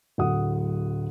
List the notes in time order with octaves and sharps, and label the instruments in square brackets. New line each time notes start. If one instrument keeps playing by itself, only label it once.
[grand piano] D1 F#3 F#5 D#6